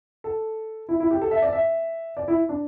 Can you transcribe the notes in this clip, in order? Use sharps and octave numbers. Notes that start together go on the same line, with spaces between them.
A4
E4
E4
G4
A4
E5
D5
E5
D5
E4
D4